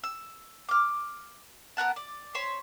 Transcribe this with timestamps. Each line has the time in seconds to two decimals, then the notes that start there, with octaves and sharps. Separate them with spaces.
0.04 E6
0.69 D6 F6
1.77 B3 A#4 F#5 A5
1.96 D5
2.35 C5 C#5 B5 C6